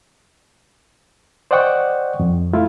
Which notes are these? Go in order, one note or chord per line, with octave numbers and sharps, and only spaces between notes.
C5 D5 D#5 F#5 G5 C#6
F2
A3 E4 F4